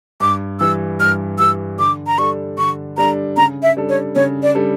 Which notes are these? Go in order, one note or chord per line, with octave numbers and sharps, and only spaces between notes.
G2 D6
E3 G3 E6
G2 F6
E3 G3 E6
D3 D6
A#5
G3 D4 A4 C#6
D3 C#6
G3 D4 A4 A#5
C#3 A#5
E5
G3 D4 A4
C#5
C#3 C#5
D5
G3 D4 A4